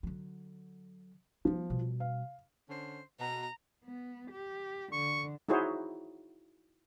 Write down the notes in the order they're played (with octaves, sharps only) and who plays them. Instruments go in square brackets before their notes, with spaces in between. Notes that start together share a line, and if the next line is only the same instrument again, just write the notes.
[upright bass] D3 F#3
[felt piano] F3 [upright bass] G3 B3
[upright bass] B2 G3
[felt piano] F5
[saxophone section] D3 C#4 C5
[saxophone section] B2 [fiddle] A#5
[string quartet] B3
G4
[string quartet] D3 [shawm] C#6
[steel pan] D#4 E4 F#4 G#4 C5 C#5